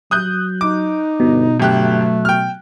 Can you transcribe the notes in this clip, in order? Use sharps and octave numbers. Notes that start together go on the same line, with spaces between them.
F#3 D#6 F#6 G6
D#4 D6
G1 B2
G1 F#3 A3 G4 F#6
G5 F6